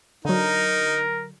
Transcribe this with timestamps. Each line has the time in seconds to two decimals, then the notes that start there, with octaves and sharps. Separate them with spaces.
0.25 D3 F#3 D#4 A#4